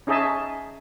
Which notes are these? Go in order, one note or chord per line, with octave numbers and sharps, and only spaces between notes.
C#4 D#4 G#4 D#5 E5 A5